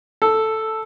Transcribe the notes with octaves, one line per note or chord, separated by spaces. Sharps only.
A4